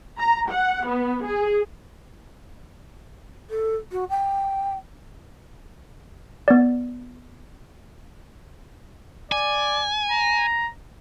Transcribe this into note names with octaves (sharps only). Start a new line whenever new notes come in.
A#5
F#5
B3
G#4
A4
F#4
G5
B3 D5
D5 G#5
A#5